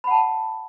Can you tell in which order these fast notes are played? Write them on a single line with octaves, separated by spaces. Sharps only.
B5 F#5 A5